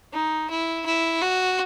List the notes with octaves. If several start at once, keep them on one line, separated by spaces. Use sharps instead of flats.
D#4
E4
E4
F#4